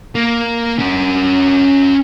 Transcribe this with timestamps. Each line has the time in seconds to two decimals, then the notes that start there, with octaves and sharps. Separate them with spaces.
0.15 A#3
0.79 C#4 A#4